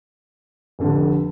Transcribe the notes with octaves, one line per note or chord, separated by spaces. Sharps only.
F1 F2 D3